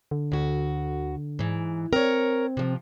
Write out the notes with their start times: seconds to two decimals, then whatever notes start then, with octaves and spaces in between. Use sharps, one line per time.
0.11 D3
0.32 D2 F#4
1.39 G#2 E3
1.93 C4 A#4 C#5
2.57 C3 F3